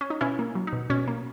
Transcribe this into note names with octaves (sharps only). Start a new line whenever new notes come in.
C#4
D#4
B2 C#4 E4
A#3
F#3
D#4
B2
B2 C#4
A#3